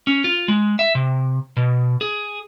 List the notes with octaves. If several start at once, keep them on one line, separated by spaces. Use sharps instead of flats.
C#4
F4
G#3
E5
C3
B2
G#4